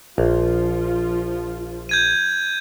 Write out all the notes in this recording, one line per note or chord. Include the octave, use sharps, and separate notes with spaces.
A#1 F3 F4
G6 G#6 D#7